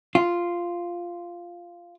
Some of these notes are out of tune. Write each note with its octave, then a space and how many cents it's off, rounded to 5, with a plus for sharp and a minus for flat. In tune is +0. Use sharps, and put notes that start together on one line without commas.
F4 -5